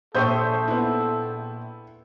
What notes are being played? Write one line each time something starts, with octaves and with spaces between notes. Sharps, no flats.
A#1 A4 C5 E5 C#6 D#6 G6
B3 E4